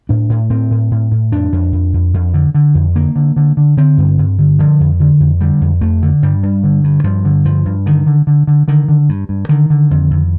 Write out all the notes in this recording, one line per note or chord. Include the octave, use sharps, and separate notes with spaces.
A2 D4
A2
A2 C4
A2
A2
A2
F2 D4
F2
F2
F2
F2
D3
D3
F2
D3 A#3
D3
D3
D3
D3 C4
G2
G2
D3
D3 F3
F2
D3
F2
D3 G3
F2
F2 A3
D3
G2 G3
G2
D3
G2
G2 F3
D3
G2 F3
G2
D3 D#3
D3
D3
D3
D3 D#3
D3
G2
G2
D3 D#3
D3
F2
F2